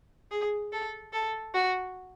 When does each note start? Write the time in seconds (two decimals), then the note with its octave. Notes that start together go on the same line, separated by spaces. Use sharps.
0.31 G#4
0.72 A4
1.13 A4
1.54 F#4